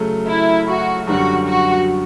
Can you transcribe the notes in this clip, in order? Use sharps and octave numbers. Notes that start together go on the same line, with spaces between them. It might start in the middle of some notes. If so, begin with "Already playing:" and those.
Already playing: C#3 F#3 A3
E4
F#4
F#2 D3 G3 F#4
F#4